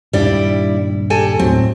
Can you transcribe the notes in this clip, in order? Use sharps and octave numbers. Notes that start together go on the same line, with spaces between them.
D#1 G2 G3 D4 E4 D5
G3 A4 G#5
A2 F#3 C4